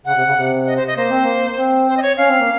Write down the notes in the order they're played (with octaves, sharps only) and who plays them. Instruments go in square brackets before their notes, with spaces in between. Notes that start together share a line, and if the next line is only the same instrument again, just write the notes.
[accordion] C#3 [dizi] F#5
[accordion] C3
C#3
C3
[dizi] D#5
C5
D#5
[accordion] A#3 [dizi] C5
[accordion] C4
A#3
C4
[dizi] C5
D#5
C#5
[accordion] C#4 [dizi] F5
[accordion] C4
A#3